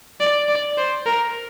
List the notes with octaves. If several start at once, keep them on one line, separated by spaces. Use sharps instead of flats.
D5
D5
C5
A#4